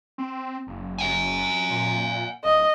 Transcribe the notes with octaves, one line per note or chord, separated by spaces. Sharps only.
C4
F#1
F#5 G#5
A#2
D1 D#5